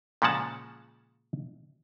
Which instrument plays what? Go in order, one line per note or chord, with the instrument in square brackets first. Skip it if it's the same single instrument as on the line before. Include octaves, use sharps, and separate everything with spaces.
[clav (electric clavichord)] A#2 C#3 F3 G#3 F#5 A5